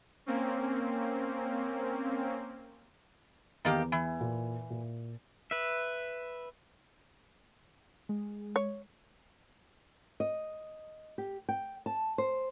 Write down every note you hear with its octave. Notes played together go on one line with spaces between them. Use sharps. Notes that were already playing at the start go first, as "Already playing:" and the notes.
A#3 C4 C#4
E2 D#3 A#3 G4
E3
A#2
A#2
B4 E5
G#3
C#5
D#5
G4
G5
A5
C5